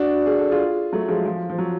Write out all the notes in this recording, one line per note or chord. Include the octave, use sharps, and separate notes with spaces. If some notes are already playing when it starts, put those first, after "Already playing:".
Already playing: D4 F#4
G#4
A4
F4 G#4
F#3 A3
F3 G#3
F3
F3
F#3